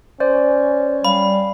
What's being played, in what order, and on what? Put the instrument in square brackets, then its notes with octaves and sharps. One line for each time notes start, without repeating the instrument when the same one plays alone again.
[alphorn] C#4 [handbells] C5 D5
[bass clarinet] G3 [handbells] F5 [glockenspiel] B5